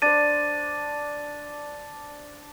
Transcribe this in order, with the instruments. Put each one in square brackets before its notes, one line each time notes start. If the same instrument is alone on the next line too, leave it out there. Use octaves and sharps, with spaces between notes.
[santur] D4 C5 [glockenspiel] A6 D#7